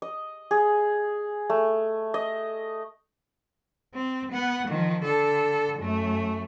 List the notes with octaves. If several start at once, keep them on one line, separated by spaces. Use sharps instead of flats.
D#5
G#4
A3
D#5
C4
B3 F#5
D#3 F3
D3 A4
F#2 A3